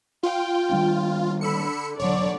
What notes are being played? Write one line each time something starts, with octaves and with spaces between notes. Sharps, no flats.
F4 G5
D#3 G3 D4
D3 B5 E6 C#7
E1 D3 F#3 C#5 D5